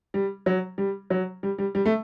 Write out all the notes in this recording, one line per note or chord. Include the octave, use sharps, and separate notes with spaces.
G3
F#3
G3
F#3
G3
G3
G3
A3